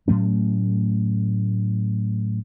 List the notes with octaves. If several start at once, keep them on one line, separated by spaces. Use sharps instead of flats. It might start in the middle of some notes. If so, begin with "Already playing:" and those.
A2 F#3 A3 C#4